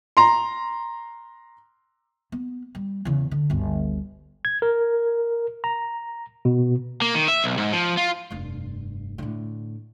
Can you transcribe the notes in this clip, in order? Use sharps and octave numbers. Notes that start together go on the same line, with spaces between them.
A#5 C6
B3
G3
E2 C#3
D3
G1 D2
G#6
A#4
A#5
B2
A#3
D#3
E5
B1
G#2
F3
F4
F1 G2
A2 D3